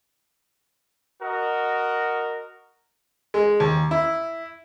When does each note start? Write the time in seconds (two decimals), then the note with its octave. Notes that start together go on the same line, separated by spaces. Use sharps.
1.21 F#4 A#4 D#5 F#5
3.34 G#3
3.60 D#2
3.91 E4